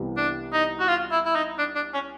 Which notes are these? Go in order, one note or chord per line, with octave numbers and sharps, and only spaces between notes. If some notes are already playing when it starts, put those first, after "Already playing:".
Already playing: C2 C3 E3 G3 B3
D4
D#4
F#4
F4
E4
E4
D#4
D4
D4
C#4